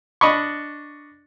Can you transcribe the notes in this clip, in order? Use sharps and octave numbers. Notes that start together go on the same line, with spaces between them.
D4 D#5 B5 C#6